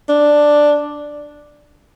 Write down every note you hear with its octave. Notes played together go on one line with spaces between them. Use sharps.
D4